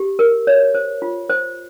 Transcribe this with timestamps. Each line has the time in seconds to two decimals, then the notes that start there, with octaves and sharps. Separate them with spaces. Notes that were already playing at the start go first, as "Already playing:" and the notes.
Already playing: G4
0.19 A#4
0.47 C#5
0.75 C5
1.02 F4
1.30 C5